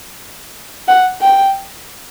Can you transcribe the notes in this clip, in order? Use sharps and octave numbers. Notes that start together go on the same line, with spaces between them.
F#5
G5